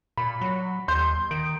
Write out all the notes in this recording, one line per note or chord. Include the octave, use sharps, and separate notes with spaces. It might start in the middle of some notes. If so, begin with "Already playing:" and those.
A#2 B5
F#3
D#2 C6 G6
D#3 D7